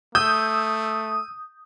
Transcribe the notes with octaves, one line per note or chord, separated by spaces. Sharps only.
A3 D#6 E6 G6